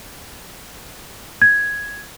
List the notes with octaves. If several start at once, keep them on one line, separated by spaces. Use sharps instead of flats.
G#6